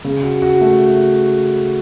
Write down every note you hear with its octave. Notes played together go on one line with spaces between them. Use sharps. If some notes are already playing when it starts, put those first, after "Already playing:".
C#3
F#4
F#4
A3